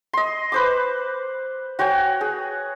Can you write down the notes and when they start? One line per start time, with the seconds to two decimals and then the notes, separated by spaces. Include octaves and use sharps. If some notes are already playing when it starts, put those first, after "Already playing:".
0.13 D#5 C6
0.52 B4 C5 D6
1.79 F#4 C#5 G5 G#5
2.21 G#4